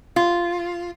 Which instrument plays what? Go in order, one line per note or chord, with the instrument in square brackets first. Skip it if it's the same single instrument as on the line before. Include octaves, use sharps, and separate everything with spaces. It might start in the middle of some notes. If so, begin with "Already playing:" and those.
[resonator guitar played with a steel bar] F4